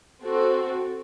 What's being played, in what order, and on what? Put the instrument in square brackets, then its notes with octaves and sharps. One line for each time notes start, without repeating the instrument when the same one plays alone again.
[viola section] C4 F#4 A4